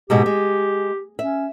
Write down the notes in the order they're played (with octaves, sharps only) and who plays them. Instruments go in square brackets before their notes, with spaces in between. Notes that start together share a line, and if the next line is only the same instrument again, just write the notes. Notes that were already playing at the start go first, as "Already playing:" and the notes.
[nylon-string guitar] G#2 B2 G#3 [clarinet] G4
[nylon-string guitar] G#3
[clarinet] C#4 [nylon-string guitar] E5